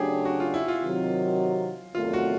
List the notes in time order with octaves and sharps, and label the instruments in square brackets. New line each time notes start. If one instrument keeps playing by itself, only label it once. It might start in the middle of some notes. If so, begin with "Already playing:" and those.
Already playing: [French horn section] C#3 F#3 A3 D4 [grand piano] G4 G#4
[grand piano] F#4
F4
E4
F4
[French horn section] C3 D#3 F#3
[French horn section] E2 C3 D#3 F#3 A3 [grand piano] F4
[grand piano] F#4